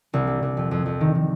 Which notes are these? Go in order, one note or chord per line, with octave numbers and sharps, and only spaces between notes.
C2
G3
C2
F2
F2
F2
D#3
D#3